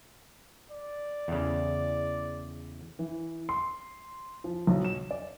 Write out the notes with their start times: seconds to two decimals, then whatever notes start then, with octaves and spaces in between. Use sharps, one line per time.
0.71 D5
1.28 E2 C#3
2.99 E3
3.49 C6
4.44 F3
4.67 B1
4.85 E7
5.11 D5